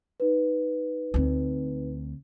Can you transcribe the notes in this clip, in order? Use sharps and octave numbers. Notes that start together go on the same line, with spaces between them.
D#4 B4
D2 C4